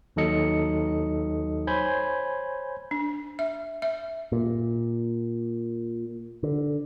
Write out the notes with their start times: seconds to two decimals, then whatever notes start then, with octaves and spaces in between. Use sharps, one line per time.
0.16 D#2 F#3 D#4 A4 D#5 C#7
1.67 C5 C#5 G#5 B5 G6 G#6
2.91 D4
3.39 E5
3.82 E5
4.32 A#2
6.43 D3